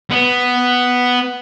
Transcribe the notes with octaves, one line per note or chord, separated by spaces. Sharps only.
B3